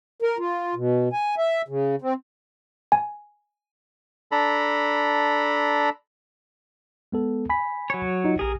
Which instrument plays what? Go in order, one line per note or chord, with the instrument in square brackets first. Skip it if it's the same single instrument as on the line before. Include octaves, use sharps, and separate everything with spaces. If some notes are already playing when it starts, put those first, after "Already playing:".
[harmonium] A#4
F4
B2
G#5
E5
C#3
C4
[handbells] G#5
[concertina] D4 A4 A#5 B5
[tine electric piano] G#3 B3 A4
G#5 B5 B6
[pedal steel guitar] F#3 C#5
[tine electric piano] D#4 F4 D#5
[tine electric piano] A#1 G4 [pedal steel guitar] G#4 A#4